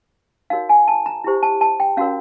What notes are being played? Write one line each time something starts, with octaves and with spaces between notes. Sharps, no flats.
D#4 F#4 A#4 C#5 F5
G#5
A5
A#5
E4 G4 C5
A5
A5
G5
C#4 F#4 A#4 C#5 F5